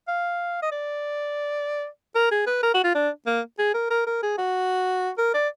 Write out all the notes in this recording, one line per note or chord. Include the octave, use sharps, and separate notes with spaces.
F5
D#5
D5
A#4
G#4
B4
A#4
F#4
F4
D4
A#3
G#4
A#4
A#4
A#4
G#4
F#4
A#4
D5